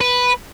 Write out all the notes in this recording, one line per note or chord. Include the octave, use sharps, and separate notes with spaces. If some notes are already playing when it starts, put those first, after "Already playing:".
B4